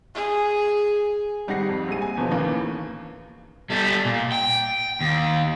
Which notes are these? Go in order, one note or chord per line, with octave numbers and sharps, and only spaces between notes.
G#4
G#1 G3 D#4 F#5 A#6 C7
F2
A#1 G3 G#4 D#7
G#5
E2 B2 D3 F3
D#2 A2 C#3 E3 A#3
G3 A4
A#2
G5
D#2